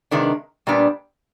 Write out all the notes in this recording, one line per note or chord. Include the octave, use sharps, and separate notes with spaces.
C3 D#3 G#3 B3 D4
A#2 G3 B3 D4